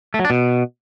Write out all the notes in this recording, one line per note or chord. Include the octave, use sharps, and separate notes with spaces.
A3
F#3
D4
B2